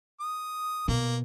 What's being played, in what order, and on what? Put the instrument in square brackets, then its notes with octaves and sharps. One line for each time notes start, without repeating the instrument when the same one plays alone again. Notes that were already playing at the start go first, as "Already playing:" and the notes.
[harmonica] D#6
[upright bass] B2 [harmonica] A#3